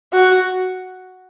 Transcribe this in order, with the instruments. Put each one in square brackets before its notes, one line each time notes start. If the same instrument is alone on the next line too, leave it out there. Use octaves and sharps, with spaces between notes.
[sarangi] F#4